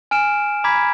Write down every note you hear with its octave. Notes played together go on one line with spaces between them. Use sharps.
G#5 F6 D7 E7
A#5 B5 D6 G#6 B6